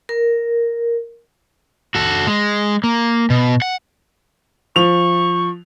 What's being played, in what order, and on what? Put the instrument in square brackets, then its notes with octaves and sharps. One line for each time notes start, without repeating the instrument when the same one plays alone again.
[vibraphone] A#4
[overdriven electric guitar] F#4 A4
G#3
A#3
B2
F#5
[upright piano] F3 F7 [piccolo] C#6